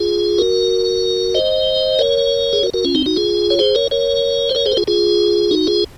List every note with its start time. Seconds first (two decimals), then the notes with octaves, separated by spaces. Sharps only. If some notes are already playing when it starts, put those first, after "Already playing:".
Already playing: F4 G#4
0.38 F#4 A#4
1.34 C5 D#5
1.99 A#4 C#5
2.53 G#4
2.63 F#4 A#4
2.74 F#4 A#4
2.85 C#4 F4
2.95 C4 D#4
3.06 D#4 F#4
3.16 F4 G#4
3.50 C#5
3.59 G#4 C5
3.75 A#4 C#5
3.91 A#4 C#5
4.49 C5
4.55 A#4 C#5
4.66 G#4 C5
4.72 A#4
4.77 F4 G#4
4.87 F4 G#4
5.51 D#4 F#4
5.67 F4 G#4